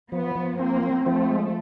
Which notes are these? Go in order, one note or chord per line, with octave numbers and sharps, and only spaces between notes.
F3 B3
F3
A#3 C4
C4
F3 A3
G#3